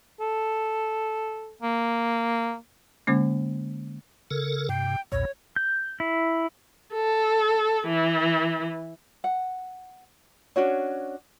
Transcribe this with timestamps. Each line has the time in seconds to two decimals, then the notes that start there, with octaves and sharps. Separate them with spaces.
0.21 A4
1.63 A#3
3.07 D3 G#3 A#3 C#4
4.31 C#3 A4 A#4
4.69 G2 C3 G5
5.12 B1 E2 A#2 C#5
5.56 G6
6.00 E4
6.94 A4
7.87 E3
9.24 F#5
10.56 C#4 D4 F#4 C#5